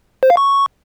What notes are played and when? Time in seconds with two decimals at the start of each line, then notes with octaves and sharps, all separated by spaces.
0.23 C5
0.30 F5
0.37 C#6